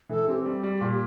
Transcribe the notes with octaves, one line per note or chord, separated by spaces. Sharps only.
E3 A4
C4 G4
G3
G3
A#2